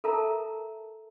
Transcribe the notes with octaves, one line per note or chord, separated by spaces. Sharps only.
A4 A#4 E5 A5 A#5